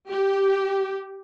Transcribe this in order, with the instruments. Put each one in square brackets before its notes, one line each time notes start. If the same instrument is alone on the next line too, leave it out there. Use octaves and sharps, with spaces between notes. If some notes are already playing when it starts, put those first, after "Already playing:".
[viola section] G4